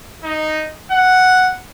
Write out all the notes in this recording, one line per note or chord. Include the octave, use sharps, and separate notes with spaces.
D#4
F#5